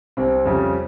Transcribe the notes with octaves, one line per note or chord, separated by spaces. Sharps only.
C2 C3 G3 C4
F2 C#3 G3